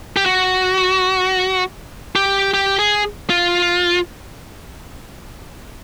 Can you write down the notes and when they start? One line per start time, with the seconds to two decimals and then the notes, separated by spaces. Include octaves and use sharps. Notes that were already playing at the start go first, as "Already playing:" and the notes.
0.17 G4
0.26 F#4
2.16 G4
2.54 G4
2.79 G#4
3.30 F4